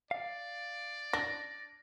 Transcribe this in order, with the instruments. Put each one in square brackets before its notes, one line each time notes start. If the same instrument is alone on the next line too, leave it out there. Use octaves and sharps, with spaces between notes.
[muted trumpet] D5 [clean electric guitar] F5
[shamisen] D4 [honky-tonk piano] A#6